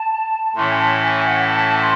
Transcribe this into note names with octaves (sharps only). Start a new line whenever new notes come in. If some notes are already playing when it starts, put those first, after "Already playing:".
Already playing: A5
A2 E3 A3 C#4 C6
G#5
A5
G#5
F#5
A5
C6